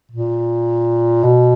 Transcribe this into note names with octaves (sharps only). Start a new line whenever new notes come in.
A#2
B2